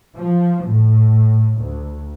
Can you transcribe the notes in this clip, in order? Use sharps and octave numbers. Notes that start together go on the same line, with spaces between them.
F3
A2
D2